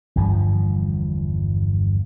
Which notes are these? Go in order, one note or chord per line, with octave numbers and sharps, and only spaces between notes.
G1 E2 G2 F3